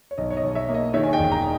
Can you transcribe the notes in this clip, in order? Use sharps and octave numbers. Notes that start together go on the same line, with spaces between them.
C#5
B1 D#5
C#5
D#5
B1
C#5 E5
A#3
D#5
D#3 C#5 E5
G#5
D#5 G5
E1
G5 A#5